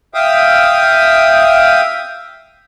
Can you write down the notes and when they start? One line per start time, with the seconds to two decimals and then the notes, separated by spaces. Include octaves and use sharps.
0.14 E5 F5 G5 D#6